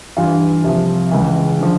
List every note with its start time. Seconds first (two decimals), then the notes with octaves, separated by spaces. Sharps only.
0.17 G2 E3 F4
0.64 C2 C3 F3
1.11 C#2 C#3 E3
1.61 D3 F3